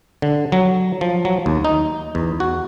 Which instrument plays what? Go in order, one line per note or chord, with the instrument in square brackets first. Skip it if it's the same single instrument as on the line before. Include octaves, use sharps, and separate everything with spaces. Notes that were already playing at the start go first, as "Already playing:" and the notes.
[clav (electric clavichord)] D3
F#3
F3
F#3
D#2
D#4
E2
F#4